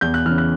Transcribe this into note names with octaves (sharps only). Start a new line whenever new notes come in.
E2 G6
F#6
C#3 E3 F6
F#6